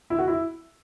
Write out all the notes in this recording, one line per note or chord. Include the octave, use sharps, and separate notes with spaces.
E4
F#4
E4